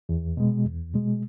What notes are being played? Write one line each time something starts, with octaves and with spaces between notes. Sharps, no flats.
E2
B2 G#3
E2
B2 G#3